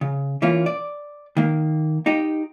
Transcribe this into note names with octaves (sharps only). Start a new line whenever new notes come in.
C#3
E3 A#3 C#4 F4
D5
D#3 A#3
D#4 G4 D#5